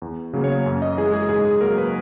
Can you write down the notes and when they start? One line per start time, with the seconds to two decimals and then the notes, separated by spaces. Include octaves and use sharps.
0.02 E2
0.33 C#3 F#3 A#3
0.44 C#5
0.66 F#2
0.82 D#5
0.97 E3 G#3 G#4
1.13 G#4
1.29 G#2 G#4
1.45 G#4
1.61 F#3 A#3 A#4
1.78 B4